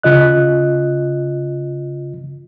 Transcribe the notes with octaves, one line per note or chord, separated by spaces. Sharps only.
C#3 F4 D#5 F#6